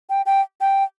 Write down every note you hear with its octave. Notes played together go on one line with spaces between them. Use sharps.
G5
G5
G5